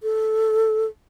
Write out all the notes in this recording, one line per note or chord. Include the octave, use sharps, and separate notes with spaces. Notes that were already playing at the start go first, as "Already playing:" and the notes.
A4